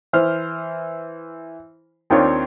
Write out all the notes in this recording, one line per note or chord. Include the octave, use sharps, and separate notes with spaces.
E3 C5 F6
D#2 D#3 C4 D4 F4 C#5